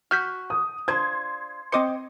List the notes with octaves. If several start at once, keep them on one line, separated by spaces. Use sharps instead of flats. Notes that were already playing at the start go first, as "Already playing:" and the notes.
F#4 F6 G6 B6
D#6
D4 F4 C5 C6 G#6
C4 C5 D#5 G5 D6 C#7